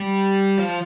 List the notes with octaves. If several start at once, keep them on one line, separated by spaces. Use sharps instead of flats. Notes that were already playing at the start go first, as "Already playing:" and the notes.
Already playing: G3
F3